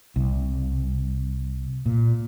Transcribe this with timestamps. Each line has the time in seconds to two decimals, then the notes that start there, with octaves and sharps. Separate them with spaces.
0.16 C2
1.86 A#2